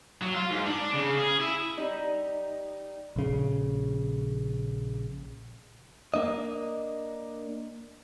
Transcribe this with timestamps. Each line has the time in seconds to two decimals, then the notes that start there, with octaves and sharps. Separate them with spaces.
0.22 F#3
0.34 F4
0.51 G#2
0.66 D4
0.94 C#3
1.18 G#4
1.40 E4
1.78 G3 D#4
3.16 A#1 C#3
6.14 A#3 D4 D#5